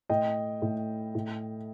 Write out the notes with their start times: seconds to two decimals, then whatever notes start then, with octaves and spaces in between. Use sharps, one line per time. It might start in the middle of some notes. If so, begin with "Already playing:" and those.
0.09 A2 D#5 G5
0.62 A2
1.15 A2